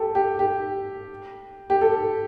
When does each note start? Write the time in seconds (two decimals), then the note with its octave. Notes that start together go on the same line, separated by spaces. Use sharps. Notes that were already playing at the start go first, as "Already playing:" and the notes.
Already playing: G4 A4
0.15 G4
0.39 G4
1.70 G4
1.81 A4